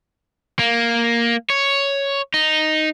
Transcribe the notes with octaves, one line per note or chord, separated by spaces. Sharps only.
A#3
C#5
D#4